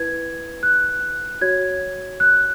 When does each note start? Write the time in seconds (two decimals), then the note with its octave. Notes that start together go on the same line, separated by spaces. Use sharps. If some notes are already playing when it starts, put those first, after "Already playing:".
Already playing: E4 B4 G#6
0.63 F#6
1.41 F#4 C#5 G#6
2.20 F#6